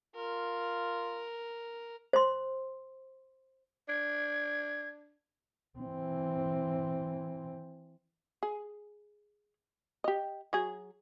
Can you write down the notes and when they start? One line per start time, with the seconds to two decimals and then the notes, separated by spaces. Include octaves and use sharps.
0.16 F4 A#4
2.13 C5 C6
3.89 D4 G#6
5.79 E3 C4
8.43 G#4
10.04 G4 D#5
10.53 F#3 G#4